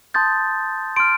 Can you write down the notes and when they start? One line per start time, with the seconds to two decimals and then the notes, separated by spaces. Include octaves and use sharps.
0.14 A5 C6 D#6 G6 A6
0.96 C6 F6 D7